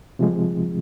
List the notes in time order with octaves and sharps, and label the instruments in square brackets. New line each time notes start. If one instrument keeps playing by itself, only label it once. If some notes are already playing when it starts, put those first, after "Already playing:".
[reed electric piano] C3 F3 G#3